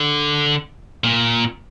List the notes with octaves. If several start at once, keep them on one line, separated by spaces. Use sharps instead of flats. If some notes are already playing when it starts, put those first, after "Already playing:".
Already playing: D3
A#2